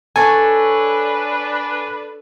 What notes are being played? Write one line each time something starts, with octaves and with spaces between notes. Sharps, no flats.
D4 A4 B4 C#5 G#5